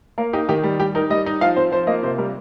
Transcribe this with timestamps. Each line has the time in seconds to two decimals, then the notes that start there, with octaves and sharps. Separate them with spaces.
0.18 A#3 A#4
0.33 D#4 G4
0.49 D#3 G4
0.64 G3
0.80 G3 G4
0.95 D#4 A#4
1.10 G3 D#5
1.26 D#4
1.41 F3 F5
1.56 C4 C5
1.72 F3 C5
1.87 A#3 D#5
2.03 C3 C5
2.18 G3 A#4